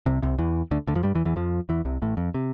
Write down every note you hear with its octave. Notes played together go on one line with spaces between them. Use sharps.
C2 C3
C2 C3
E2 E3
D2 D3
D2 D3
F2 F3
G2 G3
E2 E3
E2 E3
F2 F3
E2 E3
C2 C3
A1 A2
F2
C3